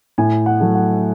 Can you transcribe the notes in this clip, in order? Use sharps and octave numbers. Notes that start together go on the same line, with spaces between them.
A2 G#5
F#5
F#3 A3
F#5